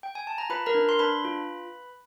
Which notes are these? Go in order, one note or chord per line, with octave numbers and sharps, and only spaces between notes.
G5
G#5
A5
A#5
F4 B4 B5
A#4 A#5
D4
C6
D4 B4 B5
F4